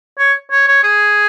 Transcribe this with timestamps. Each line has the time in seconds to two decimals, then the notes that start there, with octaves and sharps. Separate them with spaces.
0.18 C#5
0.51 C#5
0.68 C#5
0.83 G#4